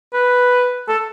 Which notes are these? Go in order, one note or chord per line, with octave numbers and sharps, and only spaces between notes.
B4
A4